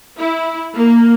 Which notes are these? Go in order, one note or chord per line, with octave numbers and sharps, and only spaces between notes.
E4
A#3